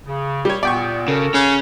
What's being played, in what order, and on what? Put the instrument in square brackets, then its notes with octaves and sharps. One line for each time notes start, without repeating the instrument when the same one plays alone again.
[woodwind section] C#3
[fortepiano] G3 C#5
[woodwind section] A#2 B3 [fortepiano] D5 G5 C#6
[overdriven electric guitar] C#3 [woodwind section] F#4 A4 A#4
[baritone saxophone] C#3 [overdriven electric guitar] C#4